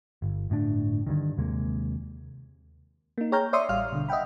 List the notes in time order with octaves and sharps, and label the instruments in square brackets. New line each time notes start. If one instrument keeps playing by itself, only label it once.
[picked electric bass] G1
G1 A2 C#3 D4
G2 D3 D#3
D#2 C3 G#3 A#3
[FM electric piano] A#3 D#4
G#4 C#5 G5 A#5 F6 G6
C#5 D5 E5 C6 C#6 D#6
A1 G3 F5 F6
B2 D3
D#5 E5 F#5 G5 B5